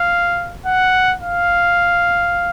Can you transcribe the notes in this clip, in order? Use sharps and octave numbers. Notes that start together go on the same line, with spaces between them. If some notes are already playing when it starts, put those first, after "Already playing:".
Already playing: F5
F#5
F5